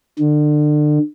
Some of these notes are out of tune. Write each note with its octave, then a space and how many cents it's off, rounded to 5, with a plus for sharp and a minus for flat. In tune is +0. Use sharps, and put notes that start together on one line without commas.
D3 +30